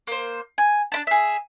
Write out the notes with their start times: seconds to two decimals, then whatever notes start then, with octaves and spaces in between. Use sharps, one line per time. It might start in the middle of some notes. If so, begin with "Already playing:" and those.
0.07 A#3 C5
0.58 G#5
0.92 D4 E4 A5
1.07 G#4 E5